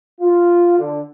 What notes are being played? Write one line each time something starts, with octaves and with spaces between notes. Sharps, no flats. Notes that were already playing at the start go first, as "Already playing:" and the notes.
F4
D3